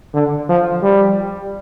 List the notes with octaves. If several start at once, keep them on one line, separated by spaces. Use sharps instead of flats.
D3
F3
G3